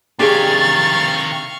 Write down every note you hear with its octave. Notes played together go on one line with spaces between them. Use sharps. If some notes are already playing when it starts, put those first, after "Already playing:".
C3 D#3 D4 G4 G#4 F5 C#6 A6